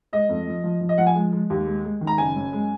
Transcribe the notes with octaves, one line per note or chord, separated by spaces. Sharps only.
G#3 D#5
F2
F3
F3
F3
D#5
F3 F#5
G#5
G#3
G#3
D#2
G#3
G#3
D#3
A#5
F#1 G#5
F#2
G#3